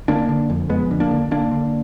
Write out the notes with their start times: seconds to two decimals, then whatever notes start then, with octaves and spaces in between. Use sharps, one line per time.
0.08 D3 A#3 D4
0.29 D3
0.50 F2
0.69 F2 G#3 B3
0.91 D3
1.00 A#3 D4
1.11 D3
1.31 D3 A#3 D4
1.51 D3